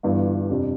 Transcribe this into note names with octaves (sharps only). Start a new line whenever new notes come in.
G1 G2 E3
F2 C3 G3 D4